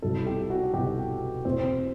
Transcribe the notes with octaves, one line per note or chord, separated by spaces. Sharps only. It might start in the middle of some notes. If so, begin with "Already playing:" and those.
C2 B2 A4
G4
F#4
C2 B2 G4
E2 B2 C4